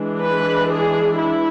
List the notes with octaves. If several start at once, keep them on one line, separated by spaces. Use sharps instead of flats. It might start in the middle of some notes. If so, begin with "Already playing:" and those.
Already playing: E3 G#3 D4
B4
G#4
E4